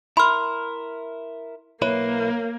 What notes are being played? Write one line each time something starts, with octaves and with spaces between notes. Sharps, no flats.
E4 A#4 B5 C6 F6
B1 A#3 E4 B4 C#5